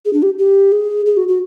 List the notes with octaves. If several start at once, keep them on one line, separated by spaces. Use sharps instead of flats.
G#4
D4
G4
G4
G#4
G#4
F#4
F#4